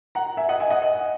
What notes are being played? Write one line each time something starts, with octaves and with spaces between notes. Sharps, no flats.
F#5 A#5
E5 G#5
D#5 F#5
E5 G#5
D#5 F#5
D#5 F#5